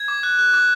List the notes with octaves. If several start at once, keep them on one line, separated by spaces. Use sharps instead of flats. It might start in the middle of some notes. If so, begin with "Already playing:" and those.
Already playing: G#6
D6
F#6
F#6
D6